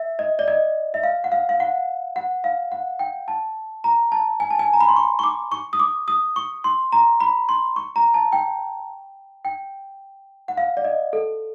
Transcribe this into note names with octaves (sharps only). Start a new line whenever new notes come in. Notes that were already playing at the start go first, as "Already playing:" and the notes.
Already playing: E5
D#5
D5
D#5
E5
F5
F#5
F5
F5
F#5
F#5
F5
F#5
G5
A5
A#5
A5
G#5
A5
G#5
A#5
B5
C6
C#6
C#6
D6
C#6
D#6
D6
D#6
C#6
C6
A#5
B5
C6
C#6
A#5
A5
G5
G5
F#5
F5
D5
D#5
A4